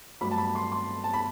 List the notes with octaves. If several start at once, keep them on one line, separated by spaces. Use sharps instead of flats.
G2 F#3 A3 B5
A5
B5
C6
C6
A5
B5